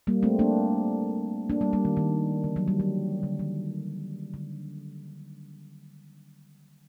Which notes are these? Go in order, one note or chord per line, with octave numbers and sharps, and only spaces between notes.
G3 A#3
A3 C4
A#3 D4
A#3 D4
G3 A#3
G3 A#3
D#3
D#3
D3
F#3
G3
F#3
D3
D#3
D3